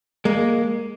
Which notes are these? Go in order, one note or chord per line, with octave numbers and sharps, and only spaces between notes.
G#3 A#3